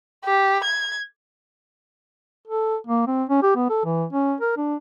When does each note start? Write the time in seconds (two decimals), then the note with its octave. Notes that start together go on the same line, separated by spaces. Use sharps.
0.25 G4
0.64 G#6
2.48 A4
2.87 A#3
3.07 C4
3.29 C#4
3.43 G4
3.56 B3
3.70 A4
3.84 E3
4.13 C#4
4.41 A#4
4.57 D4